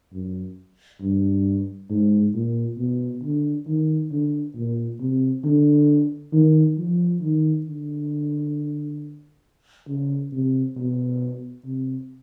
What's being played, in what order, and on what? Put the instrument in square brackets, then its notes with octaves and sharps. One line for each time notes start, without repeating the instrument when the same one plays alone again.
[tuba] F#2
G2
G#2
A#2
B2
D3
D#3
D3
A#2
C3
D3
D#3
F3
D#3
D3
C#3
C3
B2
C3